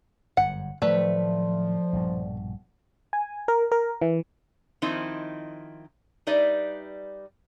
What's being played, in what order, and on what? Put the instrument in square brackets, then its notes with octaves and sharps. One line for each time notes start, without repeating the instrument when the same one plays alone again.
[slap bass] G1 F#2 [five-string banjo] F#5
[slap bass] A2 D#3 F#3 [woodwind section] F3 [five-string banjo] A3 B4 [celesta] D5
[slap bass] A#1 G2 B2
[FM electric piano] G#5
A#4
A#4
E3
[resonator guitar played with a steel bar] D#3 F3 C4 D#4 E4
G3 D#4 B4 D5 E5